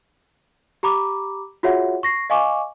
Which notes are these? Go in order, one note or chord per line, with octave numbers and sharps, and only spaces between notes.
G4 A#5 B5 D6
F4 F#4 G#4 C#5 E5 F#5
C#6 A#6 C7
D#5 F5 G#5 C#6 D6